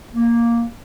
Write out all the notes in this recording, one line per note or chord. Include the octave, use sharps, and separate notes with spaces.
A#3